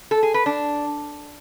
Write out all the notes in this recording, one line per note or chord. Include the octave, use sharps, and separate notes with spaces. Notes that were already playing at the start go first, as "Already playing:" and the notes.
A4
G#4
B4
D4